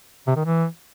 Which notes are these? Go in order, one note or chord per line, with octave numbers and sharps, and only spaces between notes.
C3
D#3
E3